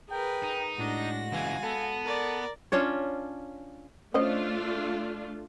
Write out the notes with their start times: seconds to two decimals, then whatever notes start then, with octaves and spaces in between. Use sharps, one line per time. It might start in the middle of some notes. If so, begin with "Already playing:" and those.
0.10 G#4 A#4 B4 G5
0.44 D#4
0.78 A2 G#3 D4 F#4 A#6
1.32 C#2 E3 F5 G#5
1.63 B3 A4
2.05 A#4 D5
2.72 C#4 D4 F4 C#5
4.14 A3 C#4 D4 F4 C5 D#5